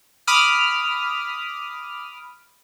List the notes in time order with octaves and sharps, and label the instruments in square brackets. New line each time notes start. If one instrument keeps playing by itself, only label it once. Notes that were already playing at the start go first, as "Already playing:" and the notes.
[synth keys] B5 D6 D#6 F6